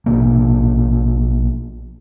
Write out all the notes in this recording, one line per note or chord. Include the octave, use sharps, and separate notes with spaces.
A#1 F2 B2 A#3